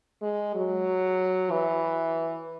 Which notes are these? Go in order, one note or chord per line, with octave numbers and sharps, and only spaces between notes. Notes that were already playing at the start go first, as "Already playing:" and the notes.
G#3
F#3
E3